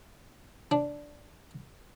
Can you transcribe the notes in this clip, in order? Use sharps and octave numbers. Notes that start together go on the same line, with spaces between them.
D4